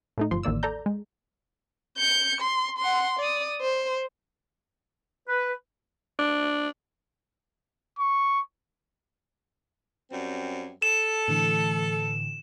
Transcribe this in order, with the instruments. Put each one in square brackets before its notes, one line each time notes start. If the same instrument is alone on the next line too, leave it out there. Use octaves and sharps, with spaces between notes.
[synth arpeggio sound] A2 A3 D#4
G1 F3 C6
A1 D#2 A#3 D5 E6
A4 D5 A#5 G6
G#3
[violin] G6 C#7
C6
F#5 C6
D5 D#6
C5
[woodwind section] B4
[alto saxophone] D4
[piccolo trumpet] C#6
[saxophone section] F#2 G3 C4
[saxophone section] A4 [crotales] E7
[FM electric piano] A2 D3 E3